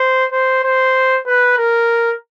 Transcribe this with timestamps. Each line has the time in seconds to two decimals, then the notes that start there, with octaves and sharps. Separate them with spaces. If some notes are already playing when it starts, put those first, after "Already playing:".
Already playing: C5
0.32 C5
0.64 C5
1.27 B4
1.58 A#4